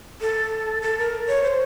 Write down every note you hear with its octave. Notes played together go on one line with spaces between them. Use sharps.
A4
A4
A#4
C#5
C5